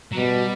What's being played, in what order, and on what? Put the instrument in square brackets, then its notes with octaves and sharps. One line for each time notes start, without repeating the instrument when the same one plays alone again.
[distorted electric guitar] F#3
[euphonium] B2 [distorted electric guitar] G3